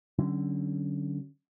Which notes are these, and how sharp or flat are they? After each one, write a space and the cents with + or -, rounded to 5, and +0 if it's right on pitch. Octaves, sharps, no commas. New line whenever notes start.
D3 +0 F#3 +30 C#4 +0